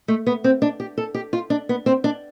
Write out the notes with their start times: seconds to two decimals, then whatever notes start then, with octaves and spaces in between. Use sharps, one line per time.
0.08 A3
0.27 B3
0.44 C4
0.62 D4
0.80 G4
0.98 A4
1.15 G4
1.33 F4
1.50 D4
1.69 B3
1.86 C4
2.04 D4